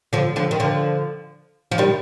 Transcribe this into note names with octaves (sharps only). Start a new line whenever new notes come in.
D3 F3
D3 F3
D#3
D3 F3
F3
D#3 G3